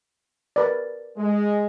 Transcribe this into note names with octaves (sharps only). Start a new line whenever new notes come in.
A#4 B4 D5
G#3